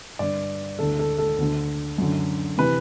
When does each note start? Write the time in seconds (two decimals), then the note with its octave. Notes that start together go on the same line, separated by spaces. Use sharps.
0.19 G2 D3 D5
0.79 D2 D3 A4
0.99 A4
1.18 A4
1.38 D2 D3
1.98 F#2 D3
2.58 C3 E3 B4